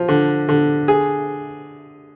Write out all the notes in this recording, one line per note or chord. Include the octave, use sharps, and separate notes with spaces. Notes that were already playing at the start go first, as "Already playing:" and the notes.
Already playing: F3
D3
D3
G#4